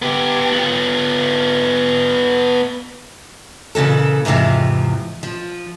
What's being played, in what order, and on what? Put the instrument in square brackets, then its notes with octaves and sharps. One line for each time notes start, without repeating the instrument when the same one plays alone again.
[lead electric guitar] B3 G4
B3 F4
[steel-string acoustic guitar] A#2 C#3 E3 A4
E2 G#2 C3 E3 F3
F3